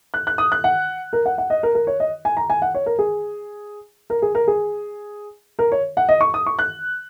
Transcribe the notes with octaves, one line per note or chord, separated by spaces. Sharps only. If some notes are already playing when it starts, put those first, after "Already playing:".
F#6
F#6
D#6
F#6
F#5
A#4
F#5
F#5
D#5
A#4
A#4
C#5
D#5
G#5
A#5
G#5
F#5
C#5
A#4
G#4
A#4
G#4
A#4
G#4
A#4
C#5
F#5
D#5
C#6
D#6
C#6
F#6